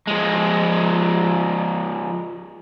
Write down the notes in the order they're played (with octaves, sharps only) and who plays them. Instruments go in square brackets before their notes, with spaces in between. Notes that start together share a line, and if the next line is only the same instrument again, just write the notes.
[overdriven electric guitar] F3 G#3